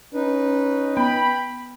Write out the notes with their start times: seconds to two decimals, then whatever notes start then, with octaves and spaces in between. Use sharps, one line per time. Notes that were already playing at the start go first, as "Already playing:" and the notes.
0.14 C#4 D#4 B4
0.97 B3 G5 B5